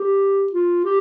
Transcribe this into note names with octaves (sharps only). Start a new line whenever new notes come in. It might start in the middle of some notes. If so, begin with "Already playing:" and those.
Already playing: G4
F4
G4